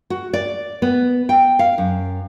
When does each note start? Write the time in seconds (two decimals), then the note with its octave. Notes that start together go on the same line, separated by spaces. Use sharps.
0.10 F#4
0.33 D5
0.82 B3
1.29 G5
1.59 F5
1.78 F#2